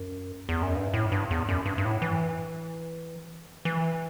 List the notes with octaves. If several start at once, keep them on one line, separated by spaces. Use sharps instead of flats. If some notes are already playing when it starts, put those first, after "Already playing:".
Already playing: F#2
E2
F#2
G2
A2
G2
E2
F#2
G2
G2
A2
E3
E3